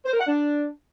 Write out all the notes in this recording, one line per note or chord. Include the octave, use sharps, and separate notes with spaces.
C5
A#4
F#5
D4